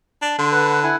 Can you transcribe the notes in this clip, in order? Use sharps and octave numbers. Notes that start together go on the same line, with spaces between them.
D4
D3 C6
B4 F#5
E4 F#5 G#5